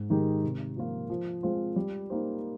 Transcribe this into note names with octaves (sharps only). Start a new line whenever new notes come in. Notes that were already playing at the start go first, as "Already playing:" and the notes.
Already playing: G#2
D#3 G#3 D#4 G4
C3
F3 A#3 F4
F3
G#3 C4 F4 C5
G3
A#3 D#4 G4 C5